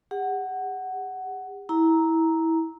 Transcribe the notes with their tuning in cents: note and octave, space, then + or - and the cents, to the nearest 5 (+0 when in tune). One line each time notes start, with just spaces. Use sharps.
G4 +45 F#5 +10
E4 -20 A#5 +0